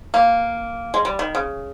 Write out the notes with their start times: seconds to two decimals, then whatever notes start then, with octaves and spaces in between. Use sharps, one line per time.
0.14 A#3
0.94 G#3
1.05 G3
1.19 D#3
1.35 C#3